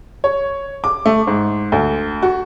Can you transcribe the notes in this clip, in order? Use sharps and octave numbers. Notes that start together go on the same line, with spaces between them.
C#5
D6
A3
G#2
D2
F#4